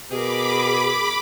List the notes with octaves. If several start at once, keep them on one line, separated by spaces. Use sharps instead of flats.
B2 G#4 A#4 B5 D6